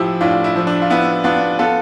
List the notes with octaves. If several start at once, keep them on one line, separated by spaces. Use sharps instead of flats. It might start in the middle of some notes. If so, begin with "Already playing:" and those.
Already playing: A2 F3 E4 G4
A2 D4 F4
E4
F3
D4
F4
B3 E4
B3 D4 F4
B3 F4 A4